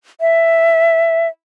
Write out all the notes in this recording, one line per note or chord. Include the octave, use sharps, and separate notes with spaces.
E5